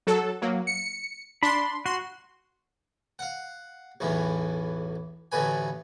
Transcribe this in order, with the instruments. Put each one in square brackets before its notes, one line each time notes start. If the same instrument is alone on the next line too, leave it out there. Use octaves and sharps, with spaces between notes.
[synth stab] F#3 A4
F#3 A#3
C#7
[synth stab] D4 C6 [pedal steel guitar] B5
[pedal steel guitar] F#4 [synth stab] C6
[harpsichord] F5 F#5
B1 E2 A2 E3
A1 D2 A2 A3 B4 G#5